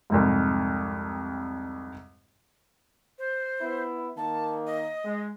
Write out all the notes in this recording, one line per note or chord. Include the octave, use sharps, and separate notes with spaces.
C2 F2 G#2
C5
B3 E4
D#3 A#3 A5
D#5
G#3